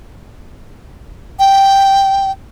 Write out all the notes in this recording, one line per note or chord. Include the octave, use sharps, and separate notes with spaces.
G5